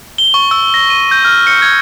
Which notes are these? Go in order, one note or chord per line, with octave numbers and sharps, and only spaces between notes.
G7
C#6
E6
A#6
D#7
G6
F6
C#7
G#6